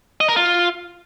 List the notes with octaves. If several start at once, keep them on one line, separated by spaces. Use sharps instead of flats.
D#5
A#4
F4